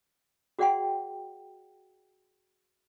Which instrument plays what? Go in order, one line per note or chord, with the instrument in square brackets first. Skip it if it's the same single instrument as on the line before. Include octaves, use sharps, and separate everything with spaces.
[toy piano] F#4 G#4 D5 F#5 G5 C6